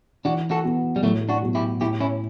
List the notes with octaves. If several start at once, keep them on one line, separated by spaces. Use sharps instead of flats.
E3 D4 F#4
F#4 A4
B3 F#4
G3
A2 F#3 A3
D4 F#4
F#3 B3 F#4
E4 G4
A2 E4 G4
C#4 E4